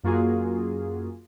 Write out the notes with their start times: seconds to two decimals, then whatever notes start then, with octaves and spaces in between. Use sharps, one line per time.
0.04 F#2 A#3 F4 F#4 G#4